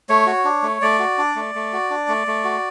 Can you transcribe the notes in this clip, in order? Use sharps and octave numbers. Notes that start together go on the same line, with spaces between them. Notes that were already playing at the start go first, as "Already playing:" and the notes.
A3 C#5
F#4
D4
A3
A3 D5
F#4
D4
A3
A3
F#4
D4
A3
A3
F#4